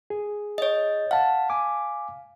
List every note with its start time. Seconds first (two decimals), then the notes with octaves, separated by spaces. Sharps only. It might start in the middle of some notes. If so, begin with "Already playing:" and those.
0.10 G#4
0.58 C#5 D#5
1.11 F5 F#5 A5
1.50 G#5 D6